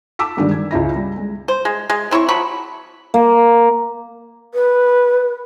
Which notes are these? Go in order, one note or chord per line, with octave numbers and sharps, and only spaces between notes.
A5 D6 E6 B6
G2 D3 D#3 G3 G#3 D4
G#6
C#2 C#3 E4 A#6
G3
G#3
C5
G#3
G#3
C4 E4 C#5 C#6
F3 F#3 B5 C#6
A#3
B4